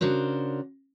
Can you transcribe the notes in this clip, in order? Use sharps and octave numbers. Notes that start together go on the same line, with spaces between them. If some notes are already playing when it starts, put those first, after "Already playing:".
C#3 D4 F#4 A#4 C5